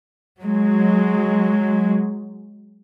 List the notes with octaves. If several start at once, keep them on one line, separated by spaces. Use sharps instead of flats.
F#3 G#3